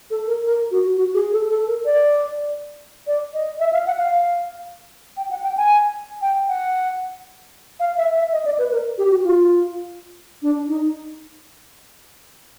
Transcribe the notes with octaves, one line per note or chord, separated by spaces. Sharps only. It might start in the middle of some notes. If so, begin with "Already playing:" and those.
A4
A#4
A#4
F#4
F#4
G#4
A4
A4
A#4
D5
D5
D#5
E5
F5
F#5
F5
G5
F#5
G5
G#5
G5
F#5
F5
E5
E5
D#5
D5
B4
A#4
G4
F#4
F4
D4
D#4